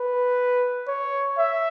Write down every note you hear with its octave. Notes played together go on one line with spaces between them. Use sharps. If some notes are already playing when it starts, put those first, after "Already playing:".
Already playing: B4
C#5
E5